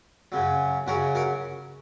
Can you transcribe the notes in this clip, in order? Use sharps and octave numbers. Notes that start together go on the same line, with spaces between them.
F#2 C#3 F#3
F#2 C#3 F#3 F#4 A#4
F#4 A#4